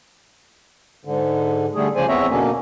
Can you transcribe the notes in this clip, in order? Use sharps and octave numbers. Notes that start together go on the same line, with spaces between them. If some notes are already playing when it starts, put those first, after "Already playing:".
G#2 D3
D3 G3 A3 G#4
C#3 F3 C#4 C5 D5 G#5
E2 B3 C4 C#5 E5 A#5
B2 D3 A#3 C#4